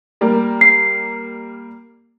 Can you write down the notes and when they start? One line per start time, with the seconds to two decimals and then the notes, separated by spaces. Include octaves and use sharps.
0.21 G3 A#3
0.61 C7